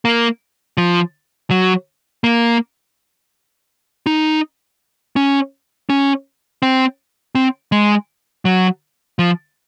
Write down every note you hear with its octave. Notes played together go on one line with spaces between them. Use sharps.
A#3
F3
F#3
A#3
D#4
C#4
C#4
C4
C4
G#3
F#3
F3